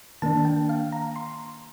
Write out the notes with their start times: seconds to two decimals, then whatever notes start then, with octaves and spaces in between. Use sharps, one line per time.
0.22 D#3 A#3 D4 A5
0.45 G5
0.69 F5
0.92 A#5
1.16 C6